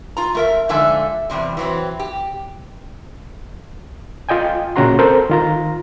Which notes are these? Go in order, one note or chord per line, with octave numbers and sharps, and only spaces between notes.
F4 A#5
A3 A#4 E5
G#2 D3 F3 A3 E5 G#5
E2 G2 C3 G3
E3 F#3 C4
G4
F4 D#5 G5 G#5
A#2 C#3 C#4 F#4 A#5 C6
C4 A4 A#4 C5
D#3 F4 A#5